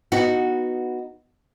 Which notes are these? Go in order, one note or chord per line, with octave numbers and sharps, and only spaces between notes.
B3 D#4 F#4